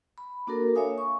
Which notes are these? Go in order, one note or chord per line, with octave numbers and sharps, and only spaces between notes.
B5
A#3 D4 F#4 A4 A#4
C#5 E5 F5 G#5 D#6
C#6